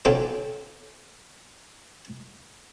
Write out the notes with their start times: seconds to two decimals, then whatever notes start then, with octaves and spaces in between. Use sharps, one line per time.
0.05 B1 D3 C4 C#4 F4 D5